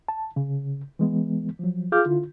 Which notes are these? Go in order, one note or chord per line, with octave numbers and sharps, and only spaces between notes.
A5
C#3
E3 G#3 B3
F3 F#3
F4 G#4 F5 D6 F6 G6
D3 E4 F4